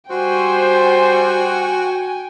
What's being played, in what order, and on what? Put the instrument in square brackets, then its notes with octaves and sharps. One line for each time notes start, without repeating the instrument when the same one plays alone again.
[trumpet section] G3 C5 [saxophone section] F#4 [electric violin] G5 G#5